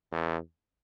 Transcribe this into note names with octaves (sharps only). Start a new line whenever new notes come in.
E2